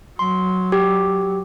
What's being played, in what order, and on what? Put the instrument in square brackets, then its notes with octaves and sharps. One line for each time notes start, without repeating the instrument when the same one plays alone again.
[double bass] F#3 [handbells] C6
[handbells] G4